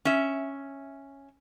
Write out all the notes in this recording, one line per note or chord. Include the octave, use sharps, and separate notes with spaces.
C#4 E5